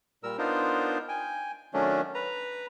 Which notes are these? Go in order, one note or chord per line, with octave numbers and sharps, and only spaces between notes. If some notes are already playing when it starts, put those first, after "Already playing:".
A#2 G3 A#4 E6
B3 D4 D#4 F4 A#4 C5
G5 G#5
D#3 F#3 A3 C#4 D4
B4 A#5